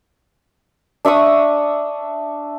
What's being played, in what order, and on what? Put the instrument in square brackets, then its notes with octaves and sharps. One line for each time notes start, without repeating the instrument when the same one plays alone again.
[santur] D4 E5 C#6 D#6